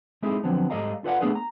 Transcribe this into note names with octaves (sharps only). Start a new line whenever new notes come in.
G#3 C4 D#4 E4 G#4 A4
D3 F3 F#3 B3 C4
G#2 G3 A4 D#5 F5 A#5
F4 A4 B4 D5 F5 F#5
A3 B3 D4 G#4 A4 B4
A#5